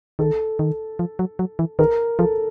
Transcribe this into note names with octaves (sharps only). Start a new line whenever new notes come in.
D#3 A4
D#3
F3
F#3
F#3
E3
D#3 A#4
F3 A4